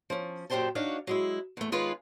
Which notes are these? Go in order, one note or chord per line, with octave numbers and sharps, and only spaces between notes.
F3 C#4
F#2 A#2 G4 C5 G5 A5
D4 D#4 F#4 C#5 F5 F#5
F#3 G#3 E4
E2 A3
D#3 G#3 F4 G#4 B4 C#5